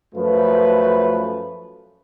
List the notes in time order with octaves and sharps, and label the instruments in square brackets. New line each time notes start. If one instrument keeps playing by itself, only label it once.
[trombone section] F#2 F3 A3 F4 B4